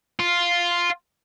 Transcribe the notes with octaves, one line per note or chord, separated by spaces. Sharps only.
F4